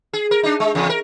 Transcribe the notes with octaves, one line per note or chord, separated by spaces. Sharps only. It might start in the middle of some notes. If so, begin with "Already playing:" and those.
G#4
A#4
D4 D#4
G#3
E2 C#3
A#4